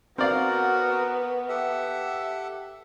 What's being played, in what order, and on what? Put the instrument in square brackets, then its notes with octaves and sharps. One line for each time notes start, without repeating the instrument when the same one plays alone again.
[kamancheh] B3 [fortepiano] C4 D5 F5 [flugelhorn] F#4 [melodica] A#4
[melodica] G4 A4 F#5 [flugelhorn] E5